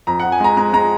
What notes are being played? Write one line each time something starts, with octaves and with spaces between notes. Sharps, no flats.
F2 A#5
F3 F#5
G#5
G#3 A#5
G#3 A#5
G#3 A#5